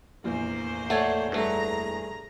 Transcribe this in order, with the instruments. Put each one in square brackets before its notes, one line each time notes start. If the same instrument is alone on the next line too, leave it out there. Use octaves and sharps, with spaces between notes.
[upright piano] F1 A#1 E2 [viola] A#3 C5
[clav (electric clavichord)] A3 [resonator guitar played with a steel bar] C#5 D5 F#5
[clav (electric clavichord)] G2 A3 [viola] G#4 A#5